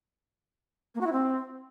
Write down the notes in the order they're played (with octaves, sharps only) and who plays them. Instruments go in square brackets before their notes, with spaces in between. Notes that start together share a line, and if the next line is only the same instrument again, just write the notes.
[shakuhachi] A#3
F#4
E4
C4